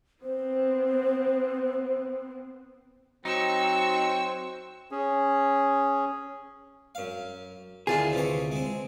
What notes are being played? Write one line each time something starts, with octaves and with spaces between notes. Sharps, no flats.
B3 C4 C5
F#3 C4 D#4 C#6 E6
C#4 G#4
F#2 F5
D2 D#3 E4 F4 G#4
C3 E3 C#5
G#3 C4